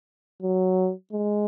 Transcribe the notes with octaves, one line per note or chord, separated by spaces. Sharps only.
F#3
G#3